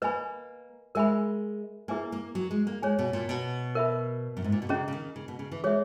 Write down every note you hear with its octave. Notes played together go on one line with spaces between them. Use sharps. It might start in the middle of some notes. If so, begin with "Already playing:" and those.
A#3 B4 D#5 G#5 B5
G#3 A#4 E5 G#5 B5
A#3 E4 G#4 B4 E5 G#5
A#3
F#3
G#3
A#3
G#3 G#4 C#5 G#5
B2
A#2
B2
A#4 E5 B5
F#2
G#2
A#2
B2
C#3 C#4 G#4 D#5 A#5
C#3
D#3
C#3
B2
C#3
E3
G#3 G#4 C#5 E5